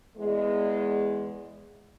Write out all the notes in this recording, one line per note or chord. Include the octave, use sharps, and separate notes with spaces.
E2 G#3